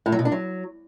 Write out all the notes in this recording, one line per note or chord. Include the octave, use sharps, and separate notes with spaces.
A2
F#3
B2
D4
F#3